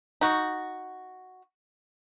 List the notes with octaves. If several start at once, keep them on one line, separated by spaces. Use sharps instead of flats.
D#4 F#4